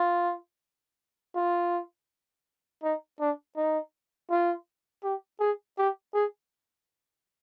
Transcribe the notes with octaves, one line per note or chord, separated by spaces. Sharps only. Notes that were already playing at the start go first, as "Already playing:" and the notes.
Already playing: F4
F4
D#4
D4
D#4
F4
G4
G#4
G4
G#4